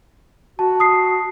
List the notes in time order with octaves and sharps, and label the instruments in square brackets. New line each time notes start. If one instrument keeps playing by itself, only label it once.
[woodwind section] F#4 [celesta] A5
[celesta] A5 D#6 C7